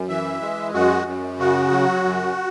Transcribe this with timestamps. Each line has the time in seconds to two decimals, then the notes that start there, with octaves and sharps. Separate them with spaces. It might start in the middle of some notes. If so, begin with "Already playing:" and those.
Already playing: F#2
0.09 E3 E5
0.42 G#3
0.74 F#2 F#4
1.06 F#2
1.39 C#3 F#4
1.71 F#3
2.04 F#2